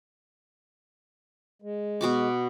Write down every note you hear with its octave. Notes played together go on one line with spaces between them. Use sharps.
G#3
B2 F#4 D6